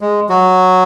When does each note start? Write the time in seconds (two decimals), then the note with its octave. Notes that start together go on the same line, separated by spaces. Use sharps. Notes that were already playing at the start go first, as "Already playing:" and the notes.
0.01 G#3
0.29 F#3 F#4